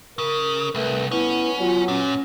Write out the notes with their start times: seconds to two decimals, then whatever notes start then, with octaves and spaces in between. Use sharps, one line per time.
0.18 C#3 A#4
0.75 C2 A3 B4
1.11 B3 C#4 E4
1.59 F#3 F4
1.88 A#2 C#4